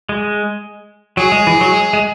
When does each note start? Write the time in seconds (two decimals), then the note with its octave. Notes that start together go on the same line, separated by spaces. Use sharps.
0.09 G#3
1.17 F#3 G#4
1.32 G#3
1.47 E3
1.61 F#3
1.72 G#3
1.93 G#3